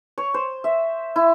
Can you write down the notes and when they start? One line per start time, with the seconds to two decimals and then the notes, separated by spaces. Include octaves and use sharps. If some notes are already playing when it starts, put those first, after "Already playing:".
0.18 C#5
0.34 C5
0.64 E5
1.16 E4